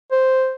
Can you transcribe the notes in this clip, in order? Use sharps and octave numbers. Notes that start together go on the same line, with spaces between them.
C5